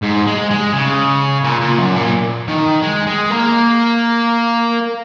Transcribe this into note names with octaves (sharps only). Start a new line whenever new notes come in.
G#2
G#3
G#3
C#3
A#2
A#2
F#2
A#2
D#3
G#3
G#3
A#3